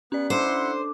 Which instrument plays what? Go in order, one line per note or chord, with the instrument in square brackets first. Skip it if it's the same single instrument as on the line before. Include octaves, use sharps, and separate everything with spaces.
[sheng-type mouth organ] B3 F#6 [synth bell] C#4 D5
[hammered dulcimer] D4 [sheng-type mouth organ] E4 F#5 C6 [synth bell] A4 [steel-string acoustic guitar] C5